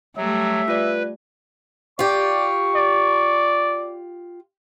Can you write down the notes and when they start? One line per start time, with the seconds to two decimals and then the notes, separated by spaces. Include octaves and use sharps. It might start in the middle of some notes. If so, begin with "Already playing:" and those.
0.17 F#3 G3 A3 E5
0.68 F4 B4 D5
1.99 F4 G4 D5 C#6
2.75 D5